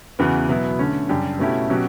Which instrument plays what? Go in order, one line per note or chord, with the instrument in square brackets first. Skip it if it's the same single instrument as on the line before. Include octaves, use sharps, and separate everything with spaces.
[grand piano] E2 C#3 E3 B3 F#4
B2 F#3 B3 E4
D3 A3 C#4
F#2 C#3 G3 D4 G4
B2 A3 C#4 E4 G4
B2 F#3 C#4 G4